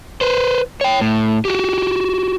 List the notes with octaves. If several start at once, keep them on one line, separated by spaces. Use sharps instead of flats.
B4 C5
C#5 G5
A2
F#4 G4